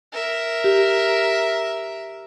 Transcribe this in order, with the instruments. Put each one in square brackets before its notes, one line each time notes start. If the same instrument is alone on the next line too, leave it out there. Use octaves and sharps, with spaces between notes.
[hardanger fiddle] A#4 E5
[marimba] G4